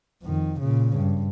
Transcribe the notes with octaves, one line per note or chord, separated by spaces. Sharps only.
F2 D#3
A#2 C#3
G2